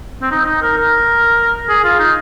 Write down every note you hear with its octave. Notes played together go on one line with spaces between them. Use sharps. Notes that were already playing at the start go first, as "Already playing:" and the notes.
C4
D#4
D#4
A#4
A#4
G#4
F4
D#4